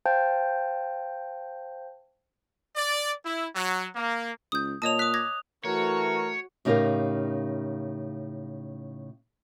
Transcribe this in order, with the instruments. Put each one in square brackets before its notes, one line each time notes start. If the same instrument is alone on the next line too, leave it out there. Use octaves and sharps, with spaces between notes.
[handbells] C5 F5 G5 A5 G6
[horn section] D5
E4
F#3
A#3
[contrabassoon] C#2 [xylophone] D#6 G6
[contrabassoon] A#2 [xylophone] C#5 D#5 A5 [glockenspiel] D#6 F7
[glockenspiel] D#6 F#6 [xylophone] B6
[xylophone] D6 G#6 A#6
[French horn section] E3 A3 [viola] F#4 [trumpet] A#4 [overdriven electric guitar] C#5
[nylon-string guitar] A2 C#3 D#4 G4 A#4 F5